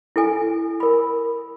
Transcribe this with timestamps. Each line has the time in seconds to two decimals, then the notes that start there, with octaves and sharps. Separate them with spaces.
0.16 E4 A4 G#5
0.80 A#4 B5